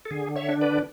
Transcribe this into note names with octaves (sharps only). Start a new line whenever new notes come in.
A4
D3 G#4
C#5 E5
D4
B4 D5